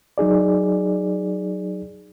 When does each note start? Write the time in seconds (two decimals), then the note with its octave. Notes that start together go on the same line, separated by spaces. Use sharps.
0.18 F#3 D#4 G#4 D5